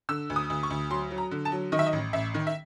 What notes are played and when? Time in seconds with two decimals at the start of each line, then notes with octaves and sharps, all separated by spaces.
0.09 D3 E6
0.30 D2
0.36 D#6
0.50 D2
0.63 C#6
0.70 D2
0.90 F#3 C6
1.11 F#3
1.18 A#5
1.31 D3
1.45 A5
1.52 F#3
1.72 D#3 D#5
1.79 E5
1.87 D#5
1.93 A1
2.13 A1 E5
2.34 D#3
2.47 E5